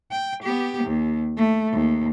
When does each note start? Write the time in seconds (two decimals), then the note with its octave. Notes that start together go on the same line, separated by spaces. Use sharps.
0.11 G5
0.43 B3 G4
0.84 D#2
1.37 A3
1.72 D#2